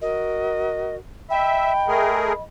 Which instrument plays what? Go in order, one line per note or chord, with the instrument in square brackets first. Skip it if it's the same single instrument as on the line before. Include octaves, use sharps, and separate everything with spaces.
[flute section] F#4 A#4 [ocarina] D#5
[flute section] D#5 B5 [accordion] E5 [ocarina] G5
[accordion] A3 G#4 A#4